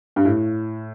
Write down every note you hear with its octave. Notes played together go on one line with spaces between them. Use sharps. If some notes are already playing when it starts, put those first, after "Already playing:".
G2
A2